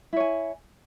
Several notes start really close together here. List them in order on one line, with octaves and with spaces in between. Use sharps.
E4 C#5 G#5